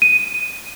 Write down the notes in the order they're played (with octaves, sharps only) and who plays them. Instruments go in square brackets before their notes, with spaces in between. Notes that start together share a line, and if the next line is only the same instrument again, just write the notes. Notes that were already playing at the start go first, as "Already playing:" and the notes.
[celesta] D#7